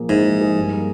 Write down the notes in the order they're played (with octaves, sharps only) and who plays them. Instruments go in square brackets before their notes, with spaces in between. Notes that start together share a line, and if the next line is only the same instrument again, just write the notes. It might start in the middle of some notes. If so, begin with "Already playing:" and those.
Already playing: [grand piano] A#2 F3 A#3 G#4
[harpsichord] G#2 [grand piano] E4
[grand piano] F3
G#4
G2
A#3